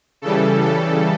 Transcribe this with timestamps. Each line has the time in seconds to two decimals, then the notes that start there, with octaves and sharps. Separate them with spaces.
0.22 C#3 E3 G3 A4
0.63 A4